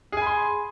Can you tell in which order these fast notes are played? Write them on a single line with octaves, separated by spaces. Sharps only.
G#4 G#5 B5 C6